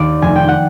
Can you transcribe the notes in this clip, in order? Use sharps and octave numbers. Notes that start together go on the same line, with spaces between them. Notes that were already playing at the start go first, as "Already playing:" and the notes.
Already playing: D#2 D5
F1 G#5
G5
F#5